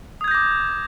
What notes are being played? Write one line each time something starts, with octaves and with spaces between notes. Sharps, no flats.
D6 D#6 G6 G#6 A#6